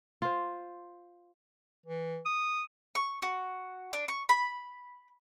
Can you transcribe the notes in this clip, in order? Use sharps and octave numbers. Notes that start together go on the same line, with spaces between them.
F4 C5
E3
D#6
C#6
F#4
D4
C#6
B5